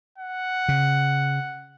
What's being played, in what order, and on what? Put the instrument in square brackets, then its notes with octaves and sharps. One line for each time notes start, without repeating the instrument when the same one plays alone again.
[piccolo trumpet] F#5
[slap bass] C#3